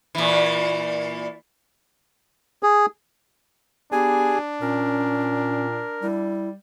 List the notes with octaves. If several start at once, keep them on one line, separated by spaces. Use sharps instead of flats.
A#2 E3
G#4
B3 D4 G4 G#4 G#5
A#2 C#4 A#4
G3 E4